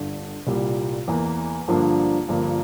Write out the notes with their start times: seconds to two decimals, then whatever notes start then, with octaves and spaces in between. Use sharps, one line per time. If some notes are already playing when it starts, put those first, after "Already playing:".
Already playing: G1 G2 D3
0.47 C2 A#2 G3
1.08 E2 E3 A#3
1.68 G2 D3 F3 A#3 D4
2.28 G1 G2 F3 A#3